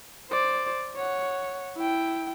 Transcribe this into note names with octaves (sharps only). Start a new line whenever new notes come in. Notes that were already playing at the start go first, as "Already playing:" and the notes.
C5 D5
C#5 F#5
E4 G5